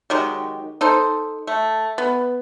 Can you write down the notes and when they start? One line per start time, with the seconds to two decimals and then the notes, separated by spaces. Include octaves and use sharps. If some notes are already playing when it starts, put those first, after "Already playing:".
0.10 D#3 F#3 G#3 G4
0.81 D#4 A4 C5
1.47 A3
1.98 B3